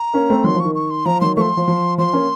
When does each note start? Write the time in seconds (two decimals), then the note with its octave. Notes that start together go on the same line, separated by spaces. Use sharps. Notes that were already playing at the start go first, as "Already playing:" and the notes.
Already playing: A#5
0.13 A#3 C#4
0.30 A3 C4
0.44 D#3 F#3 C6
0.55 F3
0.60 D#3 C#6
0.75 C#6
0.90 C6
1.06 F3 A#5
1.21 D#3 F#3 C6
1.36 F3 A3 C6 C#6
1.57 F3
1.68 F3
1.98 F3 C6
2.13 A#3 C#4